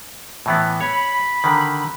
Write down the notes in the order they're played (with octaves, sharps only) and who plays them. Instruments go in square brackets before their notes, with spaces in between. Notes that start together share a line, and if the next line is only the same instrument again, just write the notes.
[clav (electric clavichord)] A2 E3 B3
[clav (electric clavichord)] C#5 [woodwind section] B5
[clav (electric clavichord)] D3 D#3